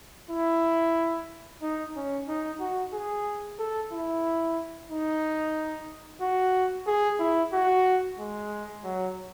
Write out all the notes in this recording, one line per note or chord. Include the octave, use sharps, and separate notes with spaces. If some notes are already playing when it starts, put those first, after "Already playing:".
E4
D#4
C#4
D#4
F#4
G#4
A4
E4
D#4
F#4
G#4
E4
F#4
G#3
F#3